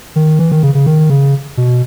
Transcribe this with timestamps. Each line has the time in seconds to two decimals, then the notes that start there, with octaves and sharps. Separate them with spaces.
0.16 D#3
0.39 E3
0.52 D#3
0.63 C#3
0.74 C#3
0.86 D#3
1.10 C#3
1.57 B2